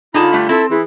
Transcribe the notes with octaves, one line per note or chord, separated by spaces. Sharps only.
D3 D#4 F4 G#4 A5 B5
G3 A3 D4
C4 E4 A4
E3 E4 G#4